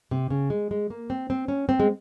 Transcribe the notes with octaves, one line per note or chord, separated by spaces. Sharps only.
C3
C#3
G#3
G#3
A#3
C4
C4
C#4
C4
G#3